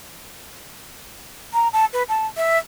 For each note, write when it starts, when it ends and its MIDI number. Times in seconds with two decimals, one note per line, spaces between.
1.54 1.68 82
1.73 1.85 81
1.93 2.03 71
2.09 2.27 81
2.37 2.58 76